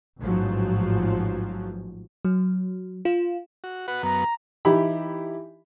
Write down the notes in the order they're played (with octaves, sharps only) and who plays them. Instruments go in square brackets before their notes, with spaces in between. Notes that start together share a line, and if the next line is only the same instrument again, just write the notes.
[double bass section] A1 G#2 F3 F#3
[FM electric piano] F#3
F4
[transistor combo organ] F#4
F#4 B4 F#5
[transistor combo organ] F#2 B3 [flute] A#5
[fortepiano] E3 D#4 E4 G4 E5 B5